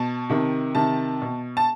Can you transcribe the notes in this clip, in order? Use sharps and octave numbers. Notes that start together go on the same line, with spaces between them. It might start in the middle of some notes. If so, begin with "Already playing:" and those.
Already playing: B2 A5
C3 D#3
C3 D#3 A5
B2
A5